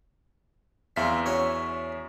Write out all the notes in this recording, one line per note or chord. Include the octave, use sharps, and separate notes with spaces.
E2 F3 C4 E5 F5 B6
C#4 F#4 C#5